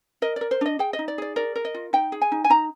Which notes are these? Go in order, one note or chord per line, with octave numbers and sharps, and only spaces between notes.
A#4 D#5
A#4 D5
C5
D4 D#5
G#4 G5
D#5
D#4
D5
G#4 D5
A#4 D5
A#4
D#5
F4
D#4 G5
G#4
G#5
D#4
G#5
D#4 A#5